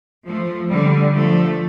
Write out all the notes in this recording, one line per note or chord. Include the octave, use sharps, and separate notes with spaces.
F3 A3
D3 G3
F3 A3